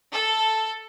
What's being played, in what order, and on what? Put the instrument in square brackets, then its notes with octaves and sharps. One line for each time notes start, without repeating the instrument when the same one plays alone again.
[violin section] A4